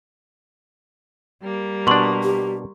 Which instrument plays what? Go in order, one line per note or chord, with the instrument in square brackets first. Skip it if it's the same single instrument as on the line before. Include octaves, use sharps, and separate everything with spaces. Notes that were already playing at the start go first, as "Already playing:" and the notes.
[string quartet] G3 A#3
[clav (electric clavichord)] B2 D4 [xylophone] C6 C#6 F#7
[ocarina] G4